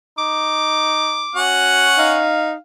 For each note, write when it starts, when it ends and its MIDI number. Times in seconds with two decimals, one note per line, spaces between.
0.18 1.24 63
0.18 1.42 86
1.35 2.27 61
1.35 1.87 66
1.35 2.27 78
1.98 2.53 63
1.98 2.57 77